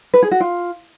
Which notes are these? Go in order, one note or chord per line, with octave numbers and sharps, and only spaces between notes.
B4
G#4
F#4
F4